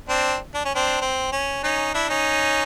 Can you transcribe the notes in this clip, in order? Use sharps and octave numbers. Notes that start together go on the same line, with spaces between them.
C4 D4
D4
C#4
C4 D4
C4
C#4
C#4 D#4
D4 E4
C#4 D#4